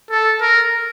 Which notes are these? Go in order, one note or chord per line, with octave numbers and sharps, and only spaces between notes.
A4
A#4